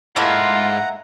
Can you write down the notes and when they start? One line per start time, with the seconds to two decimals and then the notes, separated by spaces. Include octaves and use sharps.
0.16 G#2 A3 A#3 E4 F4 F#5 A#5